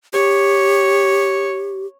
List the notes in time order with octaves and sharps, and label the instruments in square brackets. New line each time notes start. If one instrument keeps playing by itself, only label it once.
[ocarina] G4 [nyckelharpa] C#5